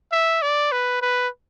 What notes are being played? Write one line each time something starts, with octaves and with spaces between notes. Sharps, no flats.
E5
D5
B4
B4